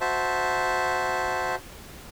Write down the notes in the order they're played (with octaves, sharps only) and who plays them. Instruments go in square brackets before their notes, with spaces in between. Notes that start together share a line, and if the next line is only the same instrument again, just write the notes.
[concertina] F#4 C5 E5 A5